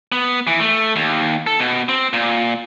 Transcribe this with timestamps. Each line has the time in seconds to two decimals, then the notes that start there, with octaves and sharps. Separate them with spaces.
0.12 B3
0.47 E3
0.60 A3
0.96 D#2
1.47 A4
1.59 B2
1.89 C4
2.13 A#2